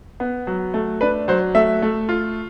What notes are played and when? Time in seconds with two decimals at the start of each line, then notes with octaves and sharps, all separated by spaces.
0.20 B3
0.47 F#3
0.74 A3
1.01 D4 B4
1.28 F#3 C5
1.55 A3 E5
1.82 A3
2.09 F4